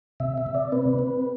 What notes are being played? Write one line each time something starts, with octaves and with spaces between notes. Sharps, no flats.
C3 E5
E5
C3
D5
C4 B4
C4